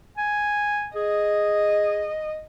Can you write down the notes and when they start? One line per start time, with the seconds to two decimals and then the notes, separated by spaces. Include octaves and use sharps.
0.18 G#5
0.96 G#4 D#5